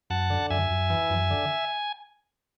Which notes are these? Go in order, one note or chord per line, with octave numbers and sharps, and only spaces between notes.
F#2 F#5 A5
D3
F#2 E5 G#5
F#2
E3
F#2
D3